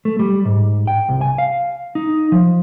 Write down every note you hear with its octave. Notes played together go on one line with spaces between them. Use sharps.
A3
G3
G#2
G5
C2
G#5
F5
D#4
F3